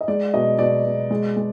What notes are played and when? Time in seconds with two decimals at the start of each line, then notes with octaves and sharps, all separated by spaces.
0.01 D#5
0.08 G#3 D5
0.34 B2 D#5
0.59 B2 D5
0.85 B2
1.10 G#3
1.37 G#3